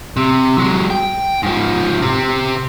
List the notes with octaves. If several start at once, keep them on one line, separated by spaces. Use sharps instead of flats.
C3
F#3 G#3
G5
G#2 F3
C3 C4